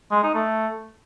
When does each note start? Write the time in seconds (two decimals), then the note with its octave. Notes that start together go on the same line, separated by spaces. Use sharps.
0.11 G#3
0.23 D#4
0.35 A3